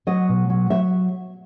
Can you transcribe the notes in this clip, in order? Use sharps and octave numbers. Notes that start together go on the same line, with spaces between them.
F#3 D#5
B2
F#3
F#3 E5